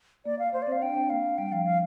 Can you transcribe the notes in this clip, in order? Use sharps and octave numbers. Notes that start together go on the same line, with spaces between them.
A#3 D5
F5
A#3 C5
D5
C4
F5
D4 G5
C4
A#3 F5
G3 G5
F3 F5
F3 F5